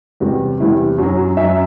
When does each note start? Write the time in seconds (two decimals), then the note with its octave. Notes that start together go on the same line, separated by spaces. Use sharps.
0.20 E2 C3 G3 F#4
0.60 E2 C3 G3 E4
0.98 F#2 F#4
1.03 F#3
1.18 F#4
1.37 F#2 F#3 E5